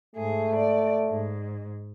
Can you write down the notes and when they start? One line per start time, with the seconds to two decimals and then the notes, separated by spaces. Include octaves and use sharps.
0.16 G#2 A3 G#4
0.54 D5
1.08 G#2